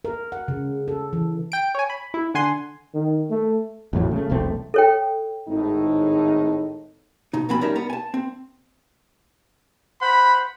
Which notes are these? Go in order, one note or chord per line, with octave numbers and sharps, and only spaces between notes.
A#4
F#5
C#3
A4
E3
G5 D7
C#5 G#5
B5
E4
D3 F#5 G#5 C6
D#3
A3
A1 F2 A2 F#3
C#3 A3
E1 B1 A3 C4
A4 C#5 G5
G#1 A2 D#4
B2 D#4
B1 B2 F3 C4 G#5 B5
G3 C#4 D#4 A#4 E5
B3 A#5
G#5 A5
C4
C5 F#5 B5